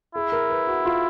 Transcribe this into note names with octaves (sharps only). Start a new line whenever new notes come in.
E4 G#4
A#4
B4
F#4
F4